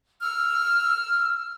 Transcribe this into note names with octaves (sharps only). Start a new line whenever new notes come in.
E6 F6